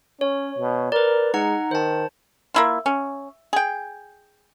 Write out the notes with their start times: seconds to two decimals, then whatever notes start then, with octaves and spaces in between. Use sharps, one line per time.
0.21 C#4 C#5
0.59 B2
0.92 A#4 B4 D5
1.34 G#3 D#4 F#5 A#5
1.71 D#3 C5 A5
2.54 A#3 E4 F4
2.86 C#4
3.53 G#4 G5